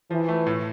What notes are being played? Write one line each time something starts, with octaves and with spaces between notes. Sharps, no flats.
E3 F3
A3
A2